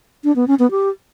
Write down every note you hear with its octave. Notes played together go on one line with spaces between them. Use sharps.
D4
B3
C#4
B3
G4